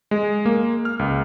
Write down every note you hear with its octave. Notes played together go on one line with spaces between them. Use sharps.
G#3
A#3
F6
C#2